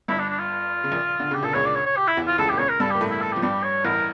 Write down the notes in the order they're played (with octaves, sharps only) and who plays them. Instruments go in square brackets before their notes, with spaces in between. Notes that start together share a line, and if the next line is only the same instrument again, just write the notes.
[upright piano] G1 G2 [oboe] E4
[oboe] D4
D4
F4
[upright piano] C#3
A#1 A#2
D3
[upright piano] C#3 [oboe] G4
[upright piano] A#2 [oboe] A4
[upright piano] C#2 C#3 [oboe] C#5
[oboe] D5
C#5
C#5
G4
E4
[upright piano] E2 E3
[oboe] F4
[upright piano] C#2 C#3 [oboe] A4
[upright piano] A#2 [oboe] G4
[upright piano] C#2 C#3 [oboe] C#5
[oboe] A#4
[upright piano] G2 G3 [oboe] A4
[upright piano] A#3 [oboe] G4
[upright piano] A2 A3
[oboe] E4
A4
G4
[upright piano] F3
[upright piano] G2 G3 [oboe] G4
[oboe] C#5
[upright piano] A1 A2 [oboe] A#4